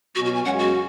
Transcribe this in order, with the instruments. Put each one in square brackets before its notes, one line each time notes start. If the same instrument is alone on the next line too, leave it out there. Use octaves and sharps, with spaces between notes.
[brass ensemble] B2 F#3 C#4 [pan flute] F#4
[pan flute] F#4
G#5
[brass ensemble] F#2 C#3 G#3 C#4 [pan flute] F#5
[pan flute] F#4